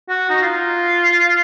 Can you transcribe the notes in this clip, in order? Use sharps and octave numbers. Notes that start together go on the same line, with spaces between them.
F#4
D#4
F4